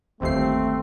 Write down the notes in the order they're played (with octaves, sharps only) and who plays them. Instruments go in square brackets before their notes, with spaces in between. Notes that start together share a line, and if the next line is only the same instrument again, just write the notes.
[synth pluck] G1 D#2 C7 [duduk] A3 [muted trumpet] C4